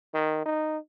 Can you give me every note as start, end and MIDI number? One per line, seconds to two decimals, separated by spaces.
0.14 0.42 51
0.46 0.78 63